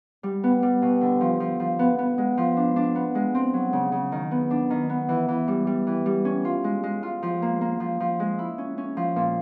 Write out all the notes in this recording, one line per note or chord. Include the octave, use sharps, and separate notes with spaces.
G3
B3
G3
B2
D3
F3
F3
F3
B3
B3
G#3
F3
D4
D4
B3
G#3
C4
F#3
C#3
C#3
D#3
B3
D4
D#3
B3
E3
E3
G3
G3
E3
G3
C#4
F4
G#3
G#3
F4
F3
A#3
A#3
F3
F3
G#3
E4
C#4
C#4
F3
A#2